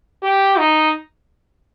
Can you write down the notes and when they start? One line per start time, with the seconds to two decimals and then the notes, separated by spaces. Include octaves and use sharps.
0.23 G4
0.58 D#4